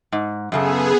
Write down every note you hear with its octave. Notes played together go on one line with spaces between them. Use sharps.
G#2
F#2 C#3 B3 G#4 A4